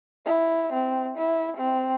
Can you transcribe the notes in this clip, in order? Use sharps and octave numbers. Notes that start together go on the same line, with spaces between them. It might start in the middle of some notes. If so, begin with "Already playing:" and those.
E4
C4
E4
C4